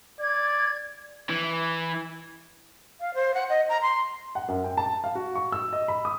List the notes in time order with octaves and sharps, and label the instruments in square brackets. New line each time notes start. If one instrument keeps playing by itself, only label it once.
[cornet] D5 [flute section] G#6
[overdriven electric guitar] E3
[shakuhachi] F5
C5
F#5
D#5
A#5
C6
[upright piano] F#5
F#2
G5
A5
F5
F#4
C#6
E6
D#5
B5
D#6